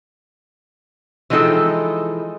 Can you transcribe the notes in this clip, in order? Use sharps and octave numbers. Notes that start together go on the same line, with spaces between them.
E3 F3 G#3 D#4 A4 G5